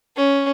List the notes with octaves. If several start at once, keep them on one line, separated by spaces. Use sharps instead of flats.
C#4